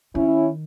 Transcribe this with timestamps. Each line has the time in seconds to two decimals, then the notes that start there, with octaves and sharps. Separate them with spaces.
0.14 D#3 C#4 E4